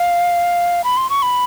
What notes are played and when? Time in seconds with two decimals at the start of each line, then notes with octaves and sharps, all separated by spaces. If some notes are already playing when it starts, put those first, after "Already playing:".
Already playing: F5
0.84 B5
0.97 C6
1.10 C#6
1.22 B5